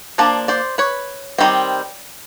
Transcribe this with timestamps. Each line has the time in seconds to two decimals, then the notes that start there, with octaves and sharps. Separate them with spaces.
0.18 F3 A#3 D4 D5
0.48 C5 D5
0.78 B4 C#5
1.38 D#3 G3 C4